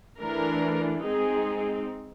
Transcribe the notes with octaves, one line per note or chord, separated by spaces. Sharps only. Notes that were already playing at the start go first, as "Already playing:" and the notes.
E3 A3 D4 A#4
G#3 C4 D#4 G#4